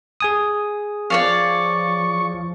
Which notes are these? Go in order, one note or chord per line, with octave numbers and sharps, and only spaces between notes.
G#4 G#5 D#6
F3 C#5 D5 F5 C#6